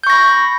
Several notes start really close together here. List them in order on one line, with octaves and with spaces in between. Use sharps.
G6 C#6 A#6 B5